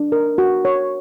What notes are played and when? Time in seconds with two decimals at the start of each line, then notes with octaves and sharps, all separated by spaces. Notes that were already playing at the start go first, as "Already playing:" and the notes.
Already playing: D4
0.12 A#4
0.38 F#4
0.65 C#5